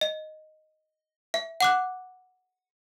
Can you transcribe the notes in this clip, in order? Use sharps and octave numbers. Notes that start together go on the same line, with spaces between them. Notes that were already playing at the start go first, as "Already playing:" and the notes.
D#5
E5
F#5 D6 F#6